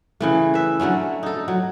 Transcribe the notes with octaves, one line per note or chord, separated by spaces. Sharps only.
C#3 E3 A3
B4 E5
D3 F#3 A3 C#4
D#4 A4
F#3